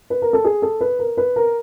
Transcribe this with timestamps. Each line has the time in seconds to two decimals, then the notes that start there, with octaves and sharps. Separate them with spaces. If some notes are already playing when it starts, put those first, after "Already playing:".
0.10 B4
0.22 A#4
0.33 A4
0.44 G#4
0.62 A4
0.81 B4
0.99 A#4
1.17 B4
1.36 A#4